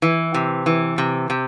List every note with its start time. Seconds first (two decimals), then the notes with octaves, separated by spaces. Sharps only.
0.02 E3
0.34 C3
0.66 E3
0.98 C3
1.30 C3